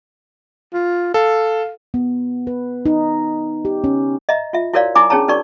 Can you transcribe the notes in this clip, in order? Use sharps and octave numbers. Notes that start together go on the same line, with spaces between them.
F4
A4 F5
B3
B4
D#4
G4
C#4
D#5 E5 A#5
F4 E5
E4 F#4 A#4 C#5 D5 F5
D#4 E4 G#5 A#5 D6
C#4 D4 G#4 C#5 A5 A#5
D4 D#4 F#4 A#4 D5 C#6